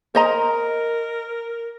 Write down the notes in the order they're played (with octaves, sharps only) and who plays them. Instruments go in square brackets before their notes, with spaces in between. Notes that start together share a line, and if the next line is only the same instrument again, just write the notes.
[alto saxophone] A#4 [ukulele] C5 D#5 A#5